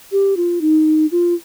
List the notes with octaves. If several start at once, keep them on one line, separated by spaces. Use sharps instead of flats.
G4
F4
D#4
F4